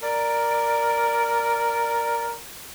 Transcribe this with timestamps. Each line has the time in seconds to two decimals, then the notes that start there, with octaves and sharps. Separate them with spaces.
0.02 A#4 D5